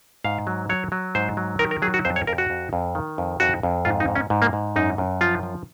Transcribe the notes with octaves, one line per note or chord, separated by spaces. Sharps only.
G#2 F5
F#3
F#3 C#5
F#3
G#2 C5
F#3
D#3 A#4
A#4
F#3 G#4
F#4
F2 C5
C#5
F2 A#4
F#4
F2
F2
D#3
F2
F2 F#4
F2
G#2 F4
D#4
G#2
C#4
G#2
A#3
G#2
F#2 D#4
F#2
F3 F4
F3